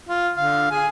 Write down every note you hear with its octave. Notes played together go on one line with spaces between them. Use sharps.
F4
D3 F5
G#4 G#5